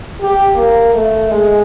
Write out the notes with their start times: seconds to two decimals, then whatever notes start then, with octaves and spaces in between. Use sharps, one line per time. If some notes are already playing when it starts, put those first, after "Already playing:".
0.22 G4
0.55 A#3
0.94 A3
1.31 G#3